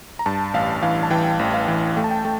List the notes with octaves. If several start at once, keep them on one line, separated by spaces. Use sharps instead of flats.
A#5
G2 A5
A1 F5
E3 F5
A5
E3 G5
A1
F5
E3
A3 G5
A5
G5
A3